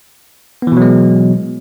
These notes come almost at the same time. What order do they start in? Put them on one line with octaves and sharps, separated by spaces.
B3 E3 B2 F#3 G#3